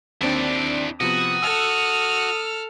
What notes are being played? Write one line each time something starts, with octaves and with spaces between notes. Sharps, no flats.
D#2 C4 D4 E4 D5
C3 F3 B3 F#4 D#6
A4 E6 F6